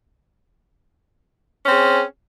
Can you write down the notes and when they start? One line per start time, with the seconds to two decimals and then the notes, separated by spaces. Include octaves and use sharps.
1.64 C#4
1.68 C4
1.71 G#4